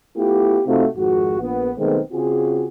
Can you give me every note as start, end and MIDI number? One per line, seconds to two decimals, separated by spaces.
0.17 0.60 57
0.17 0.60 59
0.17 0.60 64
0.17 0.60 65
0.17 0.60 67
0.66 0.86 48
0.66 0.86 57
0.66 0.86 60
0.66 0.86 63
0.66 0.86 65
0.66 0.86 66
0.98 1.36 32
0.98 1.36 41
0.98 1.36 44
0.98 1.36 66
1.40 1.71 34
1.40 1.71 59
1.77 1.99 35
1.77 1.99 51
1.77 1.99 56
1.77 1.99 57
1.77 1.99 59
1.77 1.99 60
2.12 2.68 49
2.12 2.68 60
2.12 2.68 65
2.12 2.68 66
2.12 2.68 68